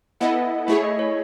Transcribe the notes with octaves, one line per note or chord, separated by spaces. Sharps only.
B3 E4 A4 D#5 F#5
A3 E4 G#4 C#5 E5
D#5
C#5